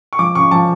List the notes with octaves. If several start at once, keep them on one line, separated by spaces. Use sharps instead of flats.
C#6
F3 D6
C#3 C#6
F3 A5